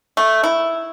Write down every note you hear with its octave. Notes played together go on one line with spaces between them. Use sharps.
A3
E4